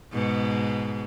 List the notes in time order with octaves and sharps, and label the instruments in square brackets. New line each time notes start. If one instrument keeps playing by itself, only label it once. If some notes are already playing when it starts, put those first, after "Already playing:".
[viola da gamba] G#2 B2 G#3